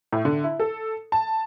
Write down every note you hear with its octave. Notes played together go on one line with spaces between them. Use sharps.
A2
D3
E4
A4
A5